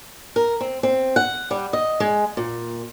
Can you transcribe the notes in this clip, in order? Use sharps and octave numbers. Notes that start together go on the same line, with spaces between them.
A#4
C4
C4
F#5
G3
D#5
G#3
A#2